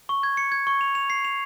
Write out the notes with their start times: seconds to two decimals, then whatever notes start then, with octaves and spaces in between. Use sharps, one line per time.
0.09 C#6
0.23 G#6
0.37 C#7
0.52 G#6
0.67 C#6
0.81 F7
0.95 F7
1.10 C7
1.25 F7